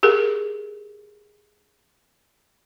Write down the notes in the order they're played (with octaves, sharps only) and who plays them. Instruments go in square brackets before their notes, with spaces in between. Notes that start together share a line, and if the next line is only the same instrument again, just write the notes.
[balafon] G4 G#4 A#4